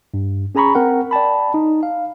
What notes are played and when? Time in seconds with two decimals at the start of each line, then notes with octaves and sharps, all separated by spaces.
0.14 G2
0.55 C#4 G#4 G#5 A#5 B5 C#6
0.74 C4 A#4 F#5 G5
1.11 D5 G5 A5 B5
1.54 D#4
1.83 F5